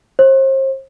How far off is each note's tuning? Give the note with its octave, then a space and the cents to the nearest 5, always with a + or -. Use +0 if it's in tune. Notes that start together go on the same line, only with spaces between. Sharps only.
C5 +40